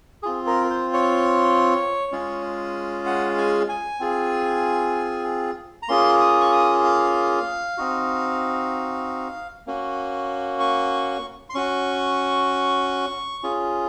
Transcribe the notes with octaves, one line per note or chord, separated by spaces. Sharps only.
C4 F4 G#4
A#4
C5
C#5
G#3 C#4 F4 G#4
F#5
G#5
G#5
C4 F4 G#4
A#5
A#3 C#4 F4 G#4 C6
D#6
C#6
D#6
F5
C4 D#4 F#4
A#3 C#4 F#4
C#6
C6
C#4 F#4 C#6
C#4 F4 G#4